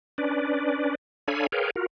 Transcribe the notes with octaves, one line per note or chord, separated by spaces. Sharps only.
C#4 D4 B4 D5
D4 A4 C#5 F5 G#5 B5
G#4 A#4 B4 C#5 F5 G5
F4 F#4 A#4